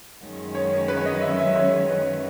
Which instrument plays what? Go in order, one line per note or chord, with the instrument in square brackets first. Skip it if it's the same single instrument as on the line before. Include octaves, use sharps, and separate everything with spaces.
[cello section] F#2 D#3 G#3 C#4
[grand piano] C#5
B4
C#5
D#5
E5
E5
C#5
B4